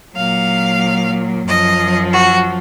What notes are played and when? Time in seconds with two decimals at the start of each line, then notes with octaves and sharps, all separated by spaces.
0.15 A#2 F#3 F5
1.47 F#2 F3 D#5
2.12 F#4